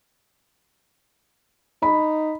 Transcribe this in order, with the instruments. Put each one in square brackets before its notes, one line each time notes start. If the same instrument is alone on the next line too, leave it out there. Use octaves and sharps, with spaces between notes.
[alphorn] D#4 [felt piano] B5